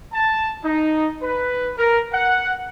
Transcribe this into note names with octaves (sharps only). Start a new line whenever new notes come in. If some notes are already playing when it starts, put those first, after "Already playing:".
A5
D#4
B4
A#4
F#5